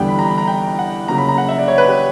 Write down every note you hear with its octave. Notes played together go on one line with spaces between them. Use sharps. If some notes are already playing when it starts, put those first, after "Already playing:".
Already playing: E2 D3 G3 B3 G5
B5
A#5
B5
A#5
G5
F#5
C#3 F#3 A#3 A#5
B5
A#5
F#5
E5
D5
C#5
B4
G4